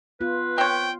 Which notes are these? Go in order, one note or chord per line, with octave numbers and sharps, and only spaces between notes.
B3 F4 B4
C4 C#5 G5